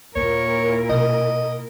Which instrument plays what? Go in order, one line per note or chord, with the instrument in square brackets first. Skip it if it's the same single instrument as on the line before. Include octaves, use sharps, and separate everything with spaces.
[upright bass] D#2 D#4 [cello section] A#2 E4 A#4 [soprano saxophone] C#5
[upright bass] B2 [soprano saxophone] D#5